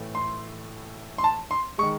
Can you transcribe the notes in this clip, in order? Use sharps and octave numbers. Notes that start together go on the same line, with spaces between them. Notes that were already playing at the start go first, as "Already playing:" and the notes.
Already playing: A2 E3 A3
C6
C6
A5
C6
D#3 G#3 C#6